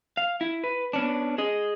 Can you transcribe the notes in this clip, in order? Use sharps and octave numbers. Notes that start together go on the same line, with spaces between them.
F5
E4
B4
B3 C#4 D4
G#4 D#5